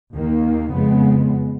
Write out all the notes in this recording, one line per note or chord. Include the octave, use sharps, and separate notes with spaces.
D#2 D#3 A#3
F2 C#3 G#3 B3